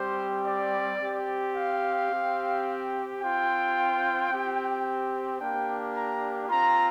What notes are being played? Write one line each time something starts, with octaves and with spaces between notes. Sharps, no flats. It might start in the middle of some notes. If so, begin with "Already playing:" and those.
Already playing: G3 C4 G4 C5
D5
C4 G4
F5
C4 G4
C4 F4 G5
C4 G4
A#3 D4 G4 G5
A#5
C4 F4 A#5